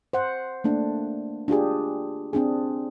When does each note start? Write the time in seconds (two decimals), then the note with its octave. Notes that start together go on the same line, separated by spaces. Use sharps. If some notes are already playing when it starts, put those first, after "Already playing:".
0.13 C5 F#5
0.64 A3 A#3 D4
1.48 D4 F4 G4 G#4
2.33 C4 D4 G#4